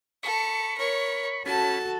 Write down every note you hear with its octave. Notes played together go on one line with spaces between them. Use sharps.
A4 B5 C#6
A#4 C#5
C#4 F#4 A4 A5 B5